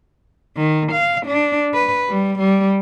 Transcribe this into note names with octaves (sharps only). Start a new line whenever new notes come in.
D#3
F5
D4
B4
G3
G3